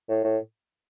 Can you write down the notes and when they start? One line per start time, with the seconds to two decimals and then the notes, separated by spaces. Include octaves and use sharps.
0.09 A2
0.24 A2